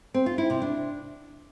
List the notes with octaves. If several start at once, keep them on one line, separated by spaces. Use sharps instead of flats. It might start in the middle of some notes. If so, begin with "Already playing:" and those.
C4
F4
E4
C3
D4